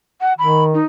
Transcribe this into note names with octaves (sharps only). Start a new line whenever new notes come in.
F#5
D#3 B5
D#4